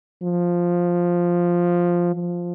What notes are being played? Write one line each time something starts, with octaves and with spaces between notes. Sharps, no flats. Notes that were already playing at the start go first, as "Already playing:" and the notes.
F3
F3